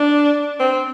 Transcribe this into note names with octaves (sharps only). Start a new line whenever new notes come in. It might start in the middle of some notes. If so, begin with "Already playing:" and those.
Already playing: D4
C4